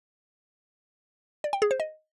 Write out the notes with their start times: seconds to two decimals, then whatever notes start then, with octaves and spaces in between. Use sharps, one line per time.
1.44 D5
1.53 G5
1.62 G#4
1.71 C5
1.80 D#5